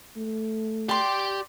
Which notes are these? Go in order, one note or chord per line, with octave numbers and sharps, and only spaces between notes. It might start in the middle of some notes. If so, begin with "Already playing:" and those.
A3
G4 D5 G5 C6